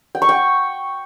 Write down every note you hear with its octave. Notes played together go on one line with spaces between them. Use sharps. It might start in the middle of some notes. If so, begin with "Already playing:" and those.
G5
C#6
G5